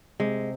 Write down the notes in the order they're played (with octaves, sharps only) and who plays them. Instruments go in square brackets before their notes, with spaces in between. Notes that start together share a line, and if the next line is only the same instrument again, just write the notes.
[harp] C3 [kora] G#3